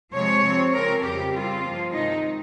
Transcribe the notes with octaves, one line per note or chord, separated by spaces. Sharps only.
C3 F3 G#3 C#5
C3 F3 C4
C#3 F3 C4 A#4
F2 C#3 G3 G4
C#3 G3 C4 F4
G2 F3 A#3
C3 D#3 G#3 D#4